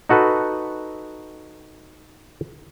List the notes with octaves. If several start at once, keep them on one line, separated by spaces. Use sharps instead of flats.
D#4 F#4 A4 B4